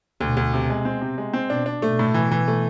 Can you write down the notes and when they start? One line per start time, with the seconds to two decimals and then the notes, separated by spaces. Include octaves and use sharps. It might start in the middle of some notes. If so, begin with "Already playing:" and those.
0.21 D2 B2
0.37 D2
0.54 C3
0.70 G#3
0.85 C4
1.02 C3
1.18 G#3
1.33 C4
1.50 B2 D4
1.66 D4
1.82 B2 A3
1.99 A2
2.14 E3
2.31 E3
2.48 A3